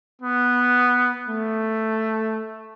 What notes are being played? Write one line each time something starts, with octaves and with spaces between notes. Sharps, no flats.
B3
A3